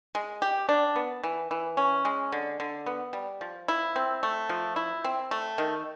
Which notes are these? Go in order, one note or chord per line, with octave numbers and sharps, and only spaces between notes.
G#3
G4
D4
B3
E3
E3
C#4
G#3
D3
D3
B3
G3
F3
E4
C4
A3
F3
E4
C4
A3
D#3